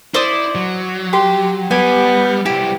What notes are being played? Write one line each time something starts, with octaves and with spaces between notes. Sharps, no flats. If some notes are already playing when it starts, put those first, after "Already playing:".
E4 C5 D5 D#6
F#3
G4 C6
G3 B3 G#5
G3 E4 G4